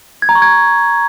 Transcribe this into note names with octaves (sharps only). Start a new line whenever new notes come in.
G#6
A#5
C#6
G#6